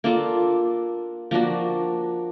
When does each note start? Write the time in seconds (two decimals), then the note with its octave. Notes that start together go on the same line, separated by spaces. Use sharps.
0.04 A#3 D4 F4 A4
1.31 F3 A#3 D4 F#4